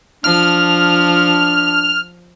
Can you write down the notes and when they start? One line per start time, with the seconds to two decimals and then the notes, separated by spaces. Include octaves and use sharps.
0.24 F3 D4 F6